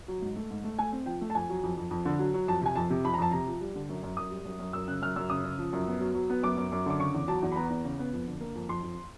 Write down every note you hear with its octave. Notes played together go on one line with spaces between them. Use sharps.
F#3
G#2
A3
G#2
A3
A3 G#5
C4
F3 G5
A3
A5
F2 G#5
F#3
F2
F2
F2
D3
F#3
F#3
F2 A5
C3 G#5
F2 A5
C3
F2 B5
A#5
F2 A5
C3 A#5
F3
G3
D3
F#2
F#2
F#2 D#6
G3
F#2
F#2
F#2 E6
C#3 F#6
F#2 F6
F#2 E6
C#3 D#6
C#3
F3
F#2
B3
F#3
F#3
B3
F#2 D6
F#2
F#2
D3 D6
C#3 C#6
E2
F#3 A5
E2
B5
B3 A#5
E2
C#3
B3
F2
D3
A#3
F2
F2 C6
F2